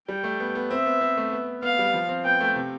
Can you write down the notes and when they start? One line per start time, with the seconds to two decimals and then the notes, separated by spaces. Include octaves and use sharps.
0.08 G3 G5
0.24 A3
0.40 B3
0.55 B3
0.70 C4 E5
0.86 B3
1.01 C4
1.17 A3
1.33 B3
1.63 B3 F5
1.79 G3
1.93 F3
2.09 C4
2.25 B3 G5
2.40 A3
2.56 C3